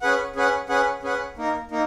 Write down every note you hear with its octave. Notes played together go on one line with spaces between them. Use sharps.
C#4 G#4 B4 F#5
C#4 G#4 B4 F#5
C#4 G#4 B4 F#5
C#4 G#4 B4 F#5
A#3 D#4 A#4
A#3 D#4